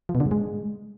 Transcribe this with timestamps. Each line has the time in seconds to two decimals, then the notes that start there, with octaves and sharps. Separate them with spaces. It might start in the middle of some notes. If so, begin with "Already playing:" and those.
0.09 F3
0.15 B2
0.20 D3
0.26 G#2
0.31 G#3